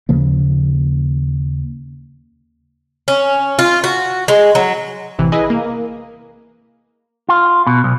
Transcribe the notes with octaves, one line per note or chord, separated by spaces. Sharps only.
D#2 C#3 F3 A#3
C#4
F4
F#4
G#3
F#3
A1 C3 E3
E4 G#4 B4 D#5 G#5
A#3
F4
B2
B1